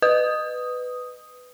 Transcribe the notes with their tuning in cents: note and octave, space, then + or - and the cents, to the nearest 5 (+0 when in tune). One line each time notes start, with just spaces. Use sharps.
B4 +10 D#6 +0